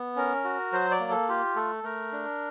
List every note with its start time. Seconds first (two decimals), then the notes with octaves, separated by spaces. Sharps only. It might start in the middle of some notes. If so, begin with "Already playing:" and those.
Already playing: B3
0.16 C#4 A#4
0.45 F#4
0.73 F#3 C5
0.91 D5
1.00 A#3
1.10 A4
1.29 F4 G4
1.56 A3 A4
1.84 A3 A#4
2.13 D4